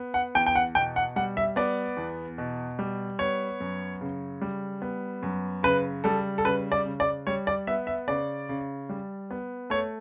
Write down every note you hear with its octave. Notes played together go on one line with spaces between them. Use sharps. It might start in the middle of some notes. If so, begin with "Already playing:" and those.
Already playing: B3
F#5
E2 G5
G5
F#5
B2 G5
F#5
G3 F#5
E5
B3 D5
E2
B2
G3
B3 C#5
F#2
C#3
G3
B3
F#2
C#3 B4
G3 A4
A4
C#3 B4
D5
C#3
D5
G3 C#5
D5
B3 E5
E5
C#3 D5
C#3
G3
B3
A3 C#5